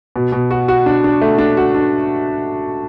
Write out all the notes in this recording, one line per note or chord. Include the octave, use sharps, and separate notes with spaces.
B2
B2
F#4
F#4
D4
D4
A3
D4
F#4
D4